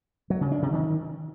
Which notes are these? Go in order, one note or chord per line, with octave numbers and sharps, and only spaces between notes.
F#3
C#3
D4
C3
D#3